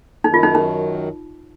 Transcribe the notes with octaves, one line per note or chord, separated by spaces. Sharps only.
F#2 D#3 F#3 D#4
F4
D#4
D#4